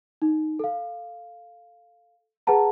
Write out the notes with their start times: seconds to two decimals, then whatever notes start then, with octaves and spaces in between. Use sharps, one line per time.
0.22 D#4
0.59 A4 F5
2.47 G#4 B4 F#5 A5 A#5